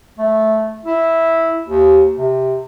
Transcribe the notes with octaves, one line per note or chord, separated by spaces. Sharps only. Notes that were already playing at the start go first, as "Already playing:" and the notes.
A3
E4
D#2
C3